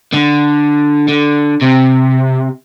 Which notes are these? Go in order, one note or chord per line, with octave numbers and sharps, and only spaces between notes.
D3
D3
C3